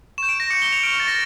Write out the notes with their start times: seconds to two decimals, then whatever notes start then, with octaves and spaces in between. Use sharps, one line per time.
0.18 C#6 G6 E7
0.29 D7
0.40 A#6
0.50 D6 G6 C#7
0.62 G7
0.73 F7
0.83 F6 D7
0.87 C#6
1.00 A6
1.08 A#6